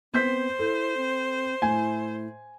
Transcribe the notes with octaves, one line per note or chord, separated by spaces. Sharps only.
B3 C4 C5 G6 B6
E4 A4
C4
A2 E4 G#5